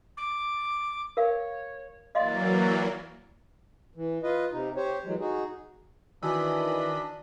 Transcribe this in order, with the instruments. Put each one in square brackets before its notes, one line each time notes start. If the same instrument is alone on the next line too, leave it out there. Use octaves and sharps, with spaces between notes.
[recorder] D6
[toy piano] A#4 F5 [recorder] C#5
[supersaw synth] E3 F#3 A#3 [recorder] D5 [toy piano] D#5 F5 C6
[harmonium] E3
F4 B4 D#5
C3 D#4
G4 C5 C#5
E3 F#3 G#3
D#4 F#4 G#4
[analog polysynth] D#3 D#5 B5 [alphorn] E3 [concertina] D4 [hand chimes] F#4 G#5 E6